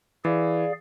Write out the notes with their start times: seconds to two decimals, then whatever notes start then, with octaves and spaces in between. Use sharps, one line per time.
0.25 E3 G#4 D5 F5